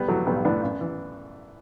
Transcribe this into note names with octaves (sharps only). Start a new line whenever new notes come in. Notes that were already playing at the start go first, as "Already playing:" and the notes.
Already playing: B1 G3 B3
A2 E3 F#3 A3
B1 G3 B3
A2 E3 B3 D4
F#2
E3